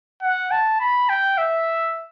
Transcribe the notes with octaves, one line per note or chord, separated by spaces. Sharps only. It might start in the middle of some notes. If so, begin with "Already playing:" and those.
F#5
A5
B5
G5
E5